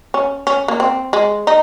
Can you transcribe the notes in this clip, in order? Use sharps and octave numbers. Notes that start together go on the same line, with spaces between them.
C#4
C#4
A#3
C4
G#3
D#4